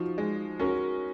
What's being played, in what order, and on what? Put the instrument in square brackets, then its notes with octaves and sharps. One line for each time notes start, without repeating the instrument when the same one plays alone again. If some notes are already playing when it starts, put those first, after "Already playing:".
Already playing: [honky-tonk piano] F3 [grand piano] D#4 F#4
[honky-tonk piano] G#3
[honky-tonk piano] C#4 [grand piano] F#4 A#4